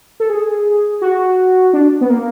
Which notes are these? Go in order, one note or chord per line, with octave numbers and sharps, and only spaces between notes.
A4
G#4
F#4
D4
B3
A#3